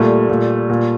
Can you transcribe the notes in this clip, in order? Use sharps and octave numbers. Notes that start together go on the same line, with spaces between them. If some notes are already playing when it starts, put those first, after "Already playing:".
Already playing: A#2 G3 A3
A#2
A#2